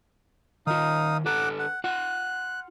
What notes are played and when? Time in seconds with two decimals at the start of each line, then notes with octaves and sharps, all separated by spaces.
0.67 D#3 D#4 F4 F5 D#6
1.26 D3 A4 B4 F#5 D6
1.59 F#5
1.84 F4 F#5 F#6